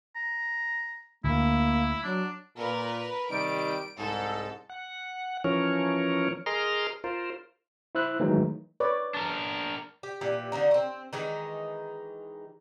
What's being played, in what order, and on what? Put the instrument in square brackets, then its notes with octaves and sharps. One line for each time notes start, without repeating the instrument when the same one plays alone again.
[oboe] A#5
[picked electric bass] D2 [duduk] A#3 [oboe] E4
[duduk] F#3 [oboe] D4
[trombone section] A#2 [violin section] A#4 B4
[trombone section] C3 D#3 G3 [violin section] D7
[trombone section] C2 G#2 [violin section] A4
[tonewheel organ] F#5
E3 F3 C#4 A#4 C#5
G#4 A#4 D#5 A#5 C6 F6
F4 A#4 C5
[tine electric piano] E4 C5 E6 F#6
D#3 E3 F#3 G#3 A3 D#4
[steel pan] B4 C#5 D5
[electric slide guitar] D4 A#4
[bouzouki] G4
A#2 E3 G4
D3 F#3 A#3 D#4
A3 C4
D#3 E3 G#3 D#4